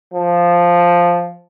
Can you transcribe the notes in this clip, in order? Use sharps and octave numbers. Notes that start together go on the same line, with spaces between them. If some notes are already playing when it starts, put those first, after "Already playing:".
F3